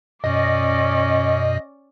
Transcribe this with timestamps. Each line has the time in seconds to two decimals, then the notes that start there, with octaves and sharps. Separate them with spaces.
0.24 F#2 B2 C#4 D5 D#5